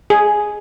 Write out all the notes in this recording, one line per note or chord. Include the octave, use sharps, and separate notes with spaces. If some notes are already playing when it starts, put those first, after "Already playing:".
G#4